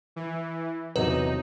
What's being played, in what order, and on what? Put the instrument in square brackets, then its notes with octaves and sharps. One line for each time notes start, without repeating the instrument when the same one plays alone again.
[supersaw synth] E3
[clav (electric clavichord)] E2 C3 F#3 [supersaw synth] D#4 [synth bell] B4